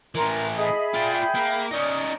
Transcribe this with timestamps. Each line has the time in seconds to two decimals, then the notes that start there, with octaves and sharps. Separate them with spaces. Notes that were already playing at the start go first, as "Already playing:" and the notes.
0.15 A2 E3 A#4 A#5 C6
0.57 G#4 D#5 E5 B5
0.94 F4 D5 G5
1.35 A#3
1.71 C#4 D#4 D5 D#6